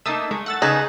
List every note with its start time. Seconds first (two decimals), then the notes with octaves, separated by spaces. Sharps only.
0.06 A3 A#3 D#4 A5 D#6 E6
0.31 G#3 A3
0.46 F#5 E6 A6
0.62 C#3 D#4 G#4 B4 G#5 A5 F#6